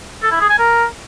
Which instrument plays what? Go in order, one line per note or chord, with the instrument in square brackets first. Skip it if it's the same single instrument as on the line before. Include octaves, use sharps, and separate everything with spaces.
[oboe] A4
E4
G#4
G#5
A#4